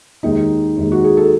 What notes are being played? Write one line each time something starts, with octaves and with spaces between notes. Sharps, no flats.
D#2 D#3 G#3 D#4
D#2 D#3 G#3
F#4
G#4
A4